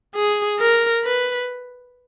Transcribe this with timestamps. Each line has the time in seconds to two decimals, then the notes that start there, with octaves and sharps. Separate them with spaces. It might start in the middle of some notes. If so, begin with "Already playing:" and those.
0.15 G#4
0.59 A#4
1.04 B4